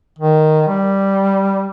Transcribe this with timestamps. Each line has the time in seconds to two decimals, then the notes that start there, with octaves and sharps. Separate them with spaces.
0.19 D#3
0.67 G3